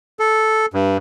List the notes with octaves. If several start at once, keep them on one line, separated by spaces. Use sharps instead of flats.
A4
G2